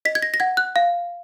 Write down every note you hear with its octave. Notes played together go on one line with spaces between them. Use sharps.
D#5 B6
G#6
A#6
A#6
F#5 G#6
F#6
F5